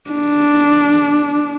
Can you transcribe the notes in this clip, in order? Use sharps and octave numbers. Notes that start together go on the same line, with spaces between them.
D4